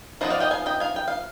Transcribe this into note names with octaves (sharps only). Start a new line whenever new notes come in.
F3 B3 D#4 C5 D#5
D5 F5
D#5 G5
F5 G#5
D#5 G5
F5 G#5
G5
F5